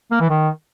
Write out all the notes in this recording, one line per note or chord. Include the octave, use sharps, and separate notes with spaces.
A#3
E3
D#3